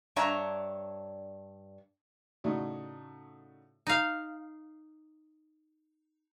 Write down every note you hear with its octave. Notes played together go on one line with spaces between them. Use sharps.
G2 D4 C#5 E5 A#5
A2 C#3 A3 D4 D#4 F#4
D#4 F5